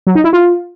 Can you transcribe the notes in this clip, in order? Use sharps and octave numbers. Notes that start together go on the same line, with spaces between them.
F#3
D#4
E4
F4